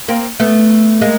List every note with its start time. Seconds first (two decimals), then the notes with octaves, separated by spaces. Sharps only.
0.08 A#3 C4
0.40 A3 B3
1.01 G#3 A#3